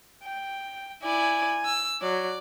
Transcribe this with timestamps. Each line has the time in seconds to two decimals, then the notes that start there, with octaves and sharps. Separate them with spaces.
0.23 G5
1.03 E4 D5 G#5
1.65 E6
2.02 F#3 D5